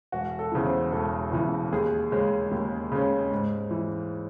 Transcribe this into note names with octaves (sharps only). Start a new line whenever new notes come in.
E1 F#4
A4
E2 C#3 E3
C5
E1 A4
E2 C#3 E3
D#2 G#4
C#3 G#3 C#4
D#2
C#3 G#3 C#4
G#2
E3